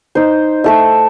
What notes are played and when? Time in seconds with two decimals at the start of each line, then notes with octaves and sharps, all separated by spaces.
0.15 D#4 C5
0.64 A3 A4 E5